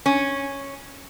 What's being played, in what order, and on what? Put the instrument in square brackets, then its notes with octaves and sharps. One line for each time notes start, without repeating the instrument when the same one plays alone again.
[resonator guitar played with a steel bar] C#4